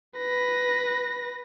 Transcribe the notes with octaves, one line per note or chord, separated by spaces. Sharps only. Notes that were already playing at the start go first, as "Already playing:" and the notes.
B4 A#6